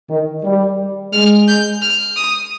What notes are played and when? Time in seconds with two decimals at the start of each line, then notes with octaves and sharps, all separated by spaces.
0.10 D#3
0.45 G3
1.13 G#3 F6
1.48 G6
1.82 F6
2.16 D#6